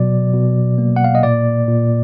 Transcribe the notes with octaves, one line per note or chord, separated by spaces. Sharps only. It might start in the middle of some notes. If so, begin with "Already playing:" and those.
Already playing: B2 F#3 D5
B2
A#3
F#5
F5
D#5
A#2 D5
A#2